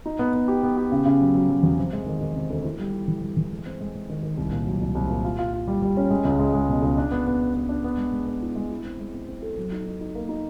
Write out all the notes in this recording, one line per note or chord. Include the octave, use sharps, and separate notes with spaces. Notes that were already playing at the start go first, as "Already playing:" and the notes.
D#4
B3
B3
G4
B3
G4
C#3
C#3
F#3
F#3
F#3
E2
C3
G#3
D#3
D#3
C3
D2
E4
G3
E4
E3
G3
E3
G#3
C4
G#3
G#3
D#3
D#3
C2
A#2
F#3
C2
C2
A#2
F4
F4
F4
G3
G3
C#4
G#3
C#2
G#3
G#3
B2
C#2
D4
B3
B3
D4
B3
D4
B3
G#3
G#3
B3
E4
G#3
E4
C4
G#3
C4
C4
A4
F#3
D#4
D#4
D#4
A#3
D#4